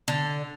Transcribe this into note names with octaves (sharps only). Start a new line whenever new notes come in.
D3